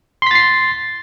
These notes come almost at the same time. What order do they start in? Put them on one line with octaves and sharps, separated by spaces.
C6 B6 A6 C7